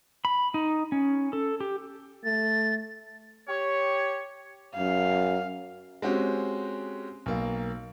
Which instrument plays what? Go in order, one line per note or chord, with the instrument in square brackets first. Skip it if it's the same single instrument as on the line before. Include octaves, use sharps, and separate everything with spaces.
[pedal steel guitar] B5
D#4
C#4
A4
G4
[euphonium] A3 [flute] A6
[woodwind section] G4 C#5
[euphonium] F#2 [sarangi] F5
[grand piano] G#3 C4 C#4 F#4 G4
B1 A#3